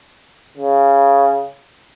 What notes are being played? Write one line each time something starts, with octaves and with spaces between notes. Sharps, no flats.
C#3